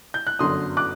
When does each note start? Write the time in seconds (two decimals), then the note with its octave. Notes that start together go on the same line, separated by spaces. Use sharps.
0.14 G6
0.27 F#6
0.39 G1 F#2 D3 F#3 C6 D#6
0.77 D6 F#6